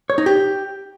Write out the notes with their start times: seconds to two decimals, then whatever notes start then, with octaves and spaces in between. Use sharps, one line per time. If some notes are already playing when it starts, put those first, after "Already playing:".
0.10 C#5
0.18 D#4
0.26 G4